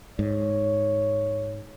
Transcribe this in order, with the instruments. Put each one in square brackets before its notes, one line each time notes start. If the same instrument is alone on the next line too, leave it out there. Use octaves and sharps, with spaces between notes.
[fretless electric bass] G#2 [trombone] C#5